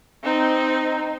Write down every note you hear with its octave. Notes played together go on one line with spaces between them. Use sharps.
C4 D#4